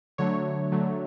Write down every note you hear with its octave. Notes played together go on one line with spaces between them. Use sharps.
D3 F#3 A3 C#5
D3 F#3 A3